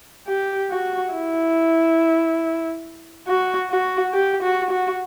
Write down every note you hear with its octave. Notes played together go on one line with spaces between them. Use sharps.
G4
F#4
E4
F#4
F#4
G4
F#4
F#4